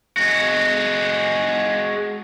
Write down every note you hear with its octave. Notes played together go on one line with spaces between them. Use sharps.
G#3 F#4